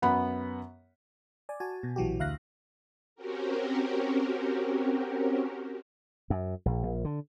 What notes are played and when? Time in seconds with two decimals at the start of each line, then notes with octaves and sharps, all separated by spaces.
0.02 F#2 B3 F#5 B5
1.49 D5 G#5
1.60 F#4 G#5 A5
1.83 B2
1.96 A#1 E3 F#3 F#4 G4
2.20 D2 E5 F5 F#6 A#6
3.16 C4 C#4 F#4 G4 A#4
6.30 F#2
6.66 A#1
6.83 A#1
7.05 D3